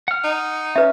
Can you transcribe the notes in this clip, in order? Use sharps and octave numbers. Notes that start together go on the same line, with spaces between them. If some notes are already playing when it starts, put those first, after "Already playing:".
F#5 F6
D#4
C#4 B4 E5